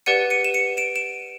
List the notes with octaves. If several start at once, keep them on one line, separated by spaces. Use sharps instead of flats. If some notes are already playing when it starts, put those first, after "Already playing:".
G4 B4 D5 F#5 C#7 D#7
C#7 D#7
E7
C#7 D#7
D7 E7
D7 E7